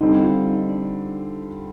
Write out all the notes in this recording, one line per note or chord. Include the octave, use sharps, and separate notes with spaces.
D3 G3 C4 D#4
F4
D#4
D4